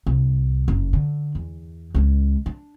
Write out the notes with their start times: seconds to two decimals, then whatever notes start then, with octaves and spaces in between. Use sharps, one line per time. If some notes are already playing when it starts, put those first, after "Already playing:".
0.07 C2
0.68 F#1 F#2
0.93 D3
1.35 E2
1.95 C#2 G#3
2.46 D4